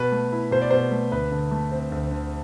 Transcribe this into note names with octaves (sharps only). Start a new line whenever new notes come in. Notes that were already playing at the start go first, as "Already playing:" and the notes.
Already playing: B2 B4
A3
E4
B2 C5
D5
B2 C5
A3
D2 B4
D3
A3
C4
D2
D3